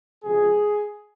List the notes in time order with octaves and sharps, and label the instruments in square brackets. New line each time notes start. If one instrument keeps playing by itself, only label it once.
[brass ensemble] C#2 C3 F3 G#3 G#4